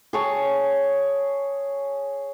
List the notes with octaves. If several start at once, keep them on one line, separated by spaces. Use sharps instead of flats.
G#4 C#5 A5